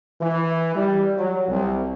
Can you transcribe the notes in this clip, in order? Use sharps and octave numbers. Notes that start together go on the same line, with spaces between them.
E3
G3
F#3
C2